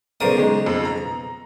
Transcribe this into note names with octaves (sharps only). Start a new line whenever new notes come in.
B1 C#3 A#4 C5 D5 D#6
D#3 G#3
F2
A#5